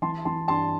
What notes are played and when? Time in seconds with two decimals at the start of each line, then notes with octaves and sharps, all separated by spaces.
0.02 E3 A5 C6
0.25 E3 A5 C6
0.48 G2 A5 C6